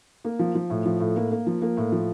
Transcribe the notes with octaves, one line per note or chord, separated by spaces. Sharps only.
A#3
F3
F3
A2
F3
A2
A#3
A#3
F3
A#3
A2
F3